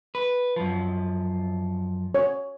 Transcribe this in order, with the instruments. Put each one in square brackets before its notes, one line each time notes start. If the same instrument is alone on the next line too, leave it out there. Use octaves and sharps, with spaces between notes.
[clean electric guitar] B4
F#2 F3
[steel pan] C#5